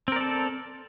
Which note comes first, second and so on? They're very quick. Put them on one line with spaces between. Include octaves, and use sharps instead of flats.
C4 A#4 D5 A4